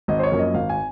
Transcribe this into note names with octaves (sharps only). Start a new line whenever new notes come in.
G#1 D#5
C5
C#5
F#2 F3 A#3
D#5
G#1 F5
G#5